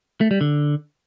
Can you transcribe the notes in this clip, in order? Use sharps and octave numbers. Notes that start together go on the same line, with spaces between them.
A3
G3
D3